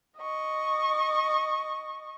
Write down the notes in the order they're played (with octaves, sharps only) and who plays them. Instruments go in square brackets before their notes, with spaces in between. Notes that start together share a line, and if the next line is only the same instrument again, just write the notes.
[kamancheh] D#5 C#6